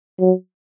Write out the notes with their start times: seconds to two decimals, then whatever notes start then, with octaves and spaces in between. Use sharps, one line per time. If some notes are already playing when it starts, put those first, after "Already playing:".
0.19 F#3